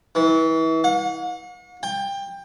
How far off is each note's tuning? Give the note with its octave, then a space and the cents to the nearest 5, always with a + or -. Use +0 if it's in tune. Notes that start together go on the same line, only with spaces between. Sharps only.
E3 -30
F#5 -45
G5 +20